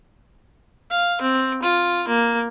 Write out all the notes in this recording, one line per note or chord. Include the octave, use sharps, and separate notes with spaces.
F5
C4
F4
A#3